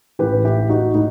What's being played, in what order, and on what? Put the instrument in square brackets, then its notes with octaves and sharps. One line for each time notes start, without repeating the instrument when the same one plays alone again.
[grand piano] A1 A2 E3 G4 B4
E4 G4
D#4 F#4
A2 D#4